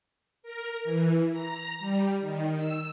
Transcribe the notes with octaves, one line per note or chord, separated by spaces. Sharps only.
A#4
E3
A#5
G3
D#3
E6